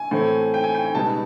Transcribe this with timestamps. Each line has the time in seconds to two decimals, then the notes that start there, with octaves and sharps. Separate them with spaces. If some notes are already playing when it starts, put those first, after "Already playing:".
Already playing: G#5
0.11 A2 E3 A3 C4
0.54 G5
0.64 G#5
0.75 G5
0.84 G#5
0.94 C#2 B2 G3 B3 D#4 A5